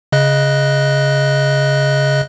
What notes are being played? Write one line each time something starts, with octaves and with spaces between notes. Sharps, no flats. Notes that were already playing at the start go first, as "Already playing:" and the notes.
C#3 D#5 F#6